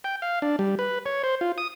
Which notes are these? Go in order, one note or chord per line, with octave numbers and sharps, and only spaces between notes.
G5
F5
D4
G3
B4
C#5
C5
F4
D#6